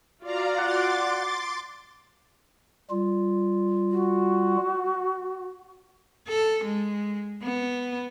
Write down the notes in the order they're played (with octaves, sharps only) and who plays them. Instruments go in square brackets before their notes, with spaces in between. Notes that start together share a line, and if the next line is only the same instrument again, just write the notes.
[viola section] F4 F#4 D5 [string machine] F5 A#5
[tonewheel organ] F#5 [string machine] C6 D6 A6
[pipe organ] G3 F4
[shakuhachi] F#4
[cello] A4
G#3
B3